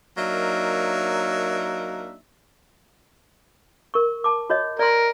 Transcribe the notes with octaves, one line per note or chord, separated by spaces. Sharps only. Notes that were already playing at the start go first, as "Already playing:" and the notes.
F#3 A#3 D4 D#4 A#4 E5
A#4 C#6
A5 D6
F#4 C#5 D#5
A#4 D5 C6